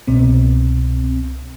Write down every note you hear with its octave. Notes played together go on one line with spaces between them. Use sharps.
C2 B2 C4